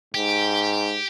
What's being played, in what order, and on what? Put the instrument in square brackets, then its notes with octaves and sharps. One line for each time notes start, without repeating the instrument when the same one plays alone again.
[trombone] G#2 [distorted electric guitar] G4